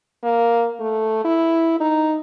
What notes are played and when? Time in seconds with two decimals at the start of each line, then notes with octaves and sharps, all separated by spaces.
0.23 A#3
0.80 A3
1.24 E4
1.80 D#4